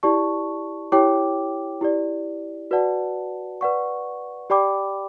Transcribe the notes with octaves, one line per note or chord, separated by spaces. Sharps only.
E4 G4 D5 A5 C#6
E4 G4 C#5 G5 D6
E4 G4 D5
F#4 B4 D5 F#5 A5
B4 D5 F#5 C#6
G4 D5 G5 B5 D6